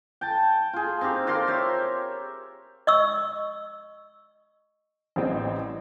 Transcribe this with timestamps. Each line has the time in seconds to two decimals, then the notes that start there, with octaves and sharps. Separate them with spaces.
0.21 G5 A5
0.73 F4 G#4
1.01 C4 D#4 F4 G4
1.27 F4 A#4 D5 C6
1.47 C5 C#5 E5
2.87 D#5 C#6 E6
5.16 A1 G3 C4 D#5